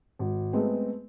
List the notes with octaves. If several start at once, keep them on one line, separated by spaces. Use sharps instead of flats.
G#1
G#3 A3 B3 C4